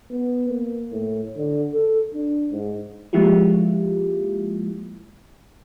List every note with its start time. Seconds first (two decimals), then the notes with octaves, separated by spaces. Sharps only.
0.11 B3
0.49 A#3
0.92 A2
1.37 D3
1.73 A4
2.14 D4
2.52 G#2
3.13 F3 G#3 A#3 E4 F4 G4